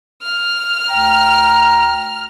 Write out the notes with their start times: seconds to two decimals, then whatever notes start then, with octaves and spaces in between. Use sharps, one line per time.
0.22 F6
0.89 D2 G5 A#5